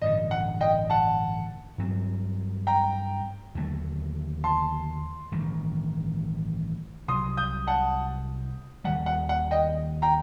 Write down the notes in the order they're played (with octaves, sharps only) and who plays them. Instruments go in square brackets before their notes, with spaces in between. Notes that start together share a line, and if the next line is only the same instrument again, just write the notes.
[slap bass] A1 G2 D3 [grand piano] D#5
[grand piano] F#5
D#5 G5
F#5 A5
[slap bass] G2 F#3 C4
[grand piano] G5 A#5
[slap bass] D#2 D3 F#3 A3
[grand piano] A5 C6
[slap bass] A1 G2 D#3
[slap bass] C2 C3 F#3 [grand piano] C6 D#6
[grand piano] D#6 G6
F#5 A5
[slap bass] D#2 D#3 G3 [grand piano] F#5
[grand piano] F#5
F#5
D#5 G5
G5 A#5